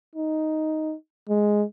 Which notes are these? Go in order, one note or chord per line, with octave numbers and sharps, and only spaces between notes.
D#4
G#3